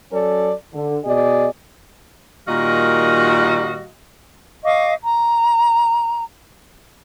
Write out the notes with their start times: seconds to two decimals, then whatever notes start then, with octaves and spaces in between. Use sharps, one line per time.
0.12 F#3 C#4 A4 D5
0.74 D3
1.05 B2 G#4 D5 D#5
2.48 A#2 D#3 G3 F#4 D#5 F5
4.64 D#5 F5 C#6 D6
5.04 A#5